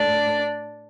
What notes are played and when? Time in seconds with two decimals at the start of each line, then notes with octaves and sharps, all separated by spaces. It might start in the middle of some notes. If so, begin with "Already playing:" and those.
Already playing: A2 A3 D4 D5